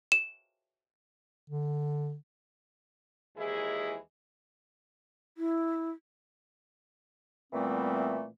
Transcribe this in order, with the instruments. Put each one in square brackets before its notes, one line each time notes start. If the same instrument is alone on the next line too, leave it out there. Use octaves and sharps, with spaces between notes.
[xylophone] E7
[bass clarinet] D3
[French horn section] D#2 E3 G#3 E4 G#4
[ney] E4
[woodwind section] A#2 E3 G3 A3 B3 C4